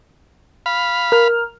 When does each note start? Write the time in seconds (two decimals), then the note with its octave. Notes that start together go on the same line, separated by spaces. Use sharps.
0.66 F5 B5
1.12 A#4 F6